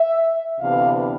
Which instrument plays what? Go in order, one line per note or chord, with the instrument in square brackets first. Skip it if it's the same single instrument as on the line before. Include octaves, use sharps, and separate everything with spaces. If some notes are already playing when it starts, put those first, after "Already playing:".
Already playing: [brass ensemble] E5
D2 C3 E3 B3 D4 F5